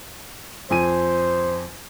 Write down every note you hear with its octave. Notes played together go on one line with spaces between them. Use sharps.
F2 C5 G#5 D#7